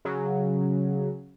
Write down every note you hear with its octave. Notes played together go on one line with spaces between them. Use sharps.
C#3 F#3